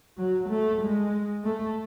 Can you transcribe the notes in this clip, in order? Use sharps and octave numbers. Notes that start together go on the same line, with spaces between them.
F#3
A3
G#3
A3